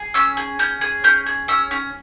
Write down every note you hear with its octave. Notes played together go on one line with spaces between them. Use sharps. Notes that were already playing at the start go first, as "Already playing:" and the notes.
Already playing: G#4
C#4 E6
G#4
C#4 G6
G#4
C#4 G6
G#4
C#4 E6
C#4